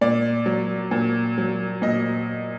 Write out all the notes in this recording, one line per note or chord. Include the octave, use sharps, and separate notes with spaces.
A#2 D5
F#3
A#2
F#3
A#2 D#5